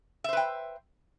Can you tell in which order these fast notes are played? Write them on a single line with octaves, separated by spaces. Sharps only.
E5 C5 B4 G5